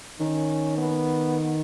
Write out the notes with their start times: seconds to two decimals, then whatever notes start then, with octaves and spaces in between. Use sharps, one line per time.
0.19 D#3 C#4
0.77 B3